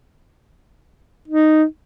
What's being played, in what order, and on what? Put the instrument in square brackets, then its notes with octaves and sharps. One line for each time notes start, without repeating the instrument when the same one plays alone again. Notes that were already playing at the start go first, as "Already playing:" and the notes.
[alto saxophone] D#4